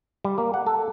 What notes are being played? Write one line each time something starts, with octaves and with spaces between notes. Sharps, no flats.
G3
A#3
F#5
A4